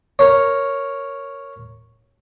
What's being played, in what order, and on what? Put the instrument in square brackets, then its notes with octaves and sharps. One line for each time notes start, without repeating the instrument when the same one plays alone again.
[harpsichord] A#4 C#5